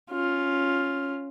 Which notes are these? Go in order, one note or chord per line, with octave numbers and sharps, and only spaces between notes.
C#4 F4